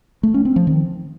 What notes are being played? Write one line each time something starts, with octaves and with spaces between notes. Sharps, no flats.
A3
C#4
C4
F3
D#3